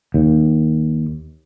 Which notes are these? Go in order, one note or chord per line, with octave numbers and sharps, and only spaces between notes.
D#2